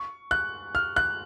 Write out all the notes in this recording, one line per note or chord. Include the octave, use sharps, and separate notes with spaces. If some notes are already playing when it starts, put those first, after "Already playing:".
Already playing: C#6
F#6
F6
F#6